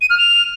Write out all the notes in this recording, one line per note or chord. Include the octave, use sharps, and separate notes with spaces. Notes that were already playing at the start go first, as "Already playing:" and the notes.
D#7
F6
F7